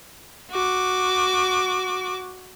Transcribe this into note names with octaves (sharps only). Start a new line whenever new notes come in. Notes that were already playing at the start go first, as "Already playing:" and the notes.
F#4 D6